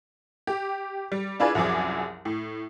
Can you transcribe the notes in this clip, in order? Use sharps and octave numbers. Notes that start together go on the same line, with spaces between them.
G4
G3
D4 E4 F4 G#4 B4 D5
C2 F#2 F3 F#3 G#4 D6
A2